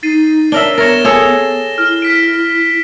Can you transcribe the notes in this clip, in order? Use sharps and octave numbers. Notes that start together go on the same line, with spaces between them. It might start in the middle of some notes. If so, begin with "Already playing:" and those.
D#4 A6 C7 D#7
D4 A#4 C#5 E5 G7
B3 A#4 C#5 A6 A#6 E7
G#4 A4 C#5
E4 F6
F6 B6 D7